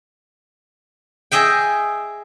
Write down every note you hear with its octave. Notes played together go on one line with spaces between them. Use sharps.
G#4 D#5 E5 G5